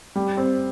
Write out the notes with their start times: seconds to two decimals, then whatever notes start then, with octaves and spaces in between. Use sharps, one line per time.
0.16 G3
0.37 C4